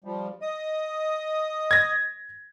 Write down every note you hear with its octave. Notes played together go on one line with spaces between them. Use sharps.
F3 G3
D#5 D#6
G#6 A#6